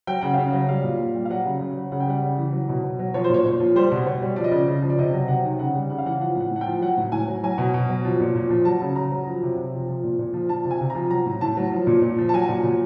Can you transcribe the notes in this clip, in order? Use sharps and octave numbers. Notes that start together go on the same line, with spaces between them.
F#3 G5
C#3 F#5
C#3 F5
F#5
F#3
G3 F5
A#2
A#2
G3
F5
F#3 F#5
C#3
C#3
F#3
C#3 F#5
G5
G3 F#5
C#3
E3
F#3
B2
B2
F#3
F3 C#5
C5
A#2 C#5
A#2
F3
G3 C5
B2
B2 C#5
G3
F3 D5
D#5
C#3 D5
C#3
F3
D5
C3 D#5
F#3
C3 F#5
D#3
C#3 F#5
G3
C#3 F#5
F5
E3 F#5
F3 F#5
A2 F#5
A2 F#5
G5
F3
F#3 F#5
A2
A2 G#5
F#3
F#3 G#5
B2
B2
F#3
F3
A#2
A#2
F3
F#3 A5
C#3
C#3 A#5
F#3
F3
C3
C3
F3
F3
A#2
A#2
F3
F3 A5
C3
G#5
C3
A#5
F3
F#3 A#5
A2
A2 A5
F#3
F3
A#2
A#2
F3
A5
F#3 G#5
A#2
A#2